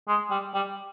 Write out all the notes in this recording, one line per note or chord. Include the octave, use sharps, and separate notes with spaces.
G#3
G3
G3